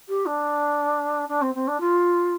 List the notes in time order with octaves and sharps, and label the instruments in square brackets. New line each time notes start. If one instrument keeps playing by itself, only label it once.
[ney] G4
D4
D4
C4
C4
D4
F4